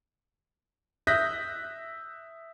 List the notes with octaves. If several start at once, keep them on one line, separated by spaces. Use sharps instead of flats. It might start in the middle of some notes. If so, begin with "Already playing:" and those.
E5 D#6 F#6 G6 A#6 B6